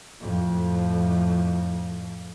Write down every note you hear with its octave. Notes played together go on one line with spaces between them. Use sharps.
F2 A2